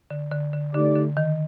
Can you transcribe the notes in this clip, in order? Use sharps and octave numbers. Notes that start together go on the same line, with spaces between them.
D3
D3
D3
D3 A3 D#4 G4 D5
D3
D#3